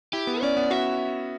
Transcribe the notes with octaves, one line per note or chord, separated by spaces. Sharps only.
E4 G4
B3
C#4 D5
B3
F#4 E5